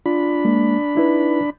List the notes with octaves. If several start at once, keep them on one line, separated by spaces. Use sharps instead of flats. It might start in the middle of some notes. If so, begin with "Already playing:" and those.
D4 F4 B5
G#3 A#3
D#4 E4 B4